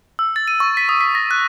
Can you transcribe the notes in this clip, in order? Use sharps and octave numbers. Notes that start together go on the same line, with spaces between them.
E6
A6
D#7
C#6
B6
D#6
B6
A#6
F#6